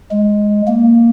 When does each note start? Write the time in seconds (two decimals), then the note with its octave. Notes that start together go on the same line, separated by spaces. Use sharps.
0.11 G#3
0.68 A#3